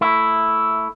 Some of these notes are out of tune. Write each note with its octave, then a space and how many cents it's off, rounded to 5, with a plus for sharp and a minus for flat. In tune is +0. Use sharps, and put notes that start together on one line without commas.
A3 +5 E4 +0